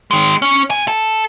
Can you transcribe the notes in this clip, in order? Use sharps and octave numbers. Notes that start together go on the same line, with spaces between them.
D#3 G#3
C#4
C3 G#5
A4